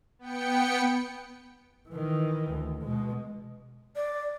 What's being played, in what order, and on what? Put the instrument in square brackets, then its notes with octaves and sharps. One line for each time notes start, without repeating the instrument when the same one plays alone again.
[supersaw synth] B3 G5 C#7
[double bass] D#3 E3
D2
B2 G#3
[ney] D5